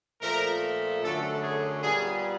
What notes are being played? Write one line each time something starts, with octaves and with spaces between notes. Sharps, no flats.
A#2 F3 A3 A#4
F#2 D3 F#3 A3 A4
G#4
A#2 G3 B3 G#4